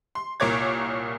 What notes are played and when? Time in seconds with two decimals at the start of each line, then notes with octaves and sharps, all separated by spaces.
0.15 C6
0.40 C2 A#2 A#4 C#5 D6 G#6